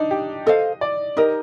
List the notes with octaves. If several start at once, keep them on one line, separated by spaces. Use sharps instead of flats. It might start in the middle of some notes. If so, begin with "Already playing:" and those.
Already playing: D4 D#4
G4
A4 C5 D#5 F5
D5
D#4 G4 A#4 D#5